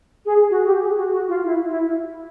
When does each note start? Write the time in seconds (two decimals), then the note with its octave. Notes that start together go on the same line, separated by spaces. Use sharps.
0.26 G#4
0.50 F#4
0.65 G4
0.81 G#4
0.96 F#4
1.12 F#4
1.28 F4
1.44 E4
1.69 E4